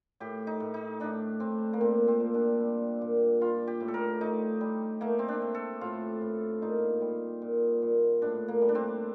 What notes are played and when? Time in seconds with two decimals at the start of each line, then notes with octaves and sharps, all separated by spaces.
0.20 A2 G4
0.47 D#4
0.60 A2
0.74 D#4
1.00 A2 D4
1.40 A2 C4
1.73 A#3
1.81 A#2 C4
2.08 C4
2.20 A#2
2.34 D4
2.60 G3
3.01 A#2
3.41 G3 F4
3.67 G4
3.80 A2
3.88 A4
3.94 A#4
4.21 A2 D#4
4.61 G3
5.01 A3 A#3
5.19 C4
5.28 D4
5.42 A3
5.54 A4
5.81 A2 F4
6.21 A2
6.62 A#2 D#4
7.01 G3
7.42 A#2
7.82 A#2
8.22 A2 D4
8.48 A#3
8.62 G3
8.69 D4
8.75 C4